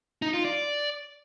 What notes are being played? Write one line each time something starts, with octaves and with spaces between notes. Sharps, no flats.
D#4
F4
D5